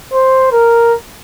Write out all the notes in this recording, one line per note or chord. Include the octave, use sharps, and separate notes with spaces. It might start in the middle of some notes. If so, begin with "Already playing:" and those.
C5
A#4